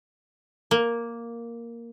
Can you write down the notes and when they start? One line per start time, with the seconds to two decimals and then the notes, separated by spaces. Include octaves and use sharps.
0.71 A#3